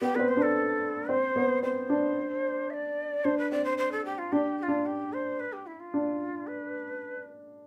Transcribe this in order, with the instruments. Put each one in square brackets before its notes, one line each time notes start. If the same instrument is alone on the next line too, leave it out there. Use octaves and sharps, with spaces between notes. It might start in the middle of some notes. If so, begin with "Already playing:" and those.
[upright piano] B3 [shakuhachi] G4
[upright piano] B3 [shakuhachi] B4
[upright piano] C4
[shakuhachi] C5
[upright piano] D4
[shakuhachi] A4
[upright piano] C4 [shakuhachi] C5
[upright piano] B3
[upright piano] C4 [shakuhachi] C5
[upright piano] D4
[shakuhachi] E5
D5
[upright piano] D4 [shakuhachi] C5
[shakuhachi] B4
[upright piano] C4 [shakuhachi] D5
[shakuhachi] C5
C5
A4
G4
F4
[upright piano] D4 [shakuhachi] G4
[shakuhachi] G4
F4
[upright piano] D4
[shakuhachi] G4
C5
B4
G4
E4
F4
[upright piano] D4
[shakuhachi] B4